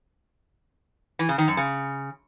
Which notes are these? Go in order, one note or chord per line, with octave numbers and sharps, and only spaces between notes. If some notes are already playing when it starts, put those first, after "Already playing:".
E3
C#3
D#3
F#2
C#3